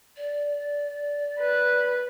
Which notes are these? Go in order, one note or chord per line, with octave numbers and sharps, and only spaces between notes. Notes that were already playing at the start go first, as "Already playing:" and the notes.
D5
B4